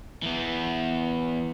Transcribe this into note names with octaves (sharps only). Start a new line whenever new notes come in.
E3 B3